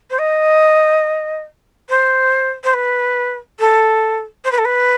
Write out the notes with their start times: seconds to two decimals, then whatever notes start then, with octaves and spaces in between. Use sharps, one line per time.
0.10 C5
0.19 D#5
1.89 C5
2.64 C5
2.73 B4
3.59 A4
4.44 C5
4.51 B4
4.58 A4
4.65 B4